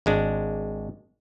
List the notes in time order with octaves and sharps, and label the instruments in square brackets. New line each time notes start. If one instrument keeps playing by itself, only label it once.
[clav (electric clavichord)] G#1 G#3 D4